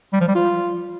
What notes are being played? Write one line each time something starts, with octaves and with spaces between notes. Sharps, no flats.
G3
F3
G3
F4